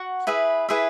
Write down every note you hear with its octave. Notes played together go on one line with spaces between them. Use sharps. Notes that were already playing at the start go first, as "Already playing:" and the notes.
Already playing: F#4 F#5 C#6
E4 G#4 B4 E5
E4 G#4 B4 E5